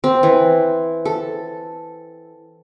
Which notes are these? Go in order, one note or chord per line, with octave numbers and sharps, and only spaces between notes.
C4
E3
A4